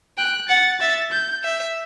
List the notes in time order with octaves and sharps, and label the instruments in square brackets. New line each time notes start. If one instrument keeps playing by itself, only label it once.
[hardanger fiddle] G5 [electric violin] F#6
[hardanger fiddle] F#5 [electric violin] A6
[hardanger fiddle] E5 [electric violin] A6
[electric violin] G6
[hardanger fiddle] E5